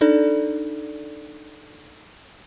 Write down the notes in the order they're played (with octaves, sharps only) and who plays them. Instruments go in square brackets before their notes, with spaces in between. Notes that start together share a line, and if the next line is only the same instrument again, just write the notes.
[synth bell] D4 D#4 A4 D5